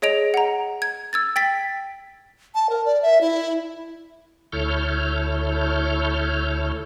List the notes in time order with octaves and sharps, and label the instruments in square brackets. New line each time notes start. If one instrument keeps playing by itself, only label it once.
[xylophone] G#4 C#5 D#5 D7 F7
F#5 A#5
G#6
E6 G#6 A6
G5 A6 B6
[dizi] A5
A#4
D5
E5
E4
[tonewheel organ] D2 E4 A4 C#5 F6 G6